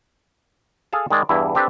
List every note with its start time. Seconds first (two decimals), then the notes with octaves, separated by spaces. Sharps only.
0.93 G#4 A4 F5 A5
1.10 D#3 G#3 D5
1.29 E2 G2 E4
1.55 C4 D4 G4 A4 B4